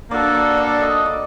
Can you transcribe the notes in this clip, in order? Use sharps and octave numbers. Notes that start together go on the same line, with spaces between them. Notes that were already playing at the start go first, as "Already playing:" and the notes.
A#3 D4 F#4 A4 D5
D5
D5
D#5
D5